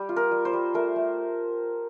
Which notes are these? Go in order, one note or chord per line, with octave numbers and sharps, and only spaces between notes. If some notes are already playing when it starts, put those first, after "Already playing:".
Already playing: G3 G4
F4
A#4
G3
C5
G3
A3 A#4
A3